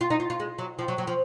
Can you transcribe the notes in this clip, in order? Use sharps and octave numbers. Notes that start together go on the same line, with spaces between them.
F4
D#4
F4
F4
G#3
F#3
F3
F#3
F#3
F3